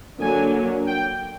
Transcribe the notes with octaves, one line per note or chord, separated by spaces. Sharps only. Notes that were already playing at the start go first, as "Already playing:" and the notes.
D3 F#3 A#3 D4 G#5
G5